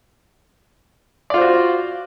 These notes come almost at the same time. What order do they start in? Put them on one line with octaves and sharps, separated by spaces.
D5 F4 C5 F#4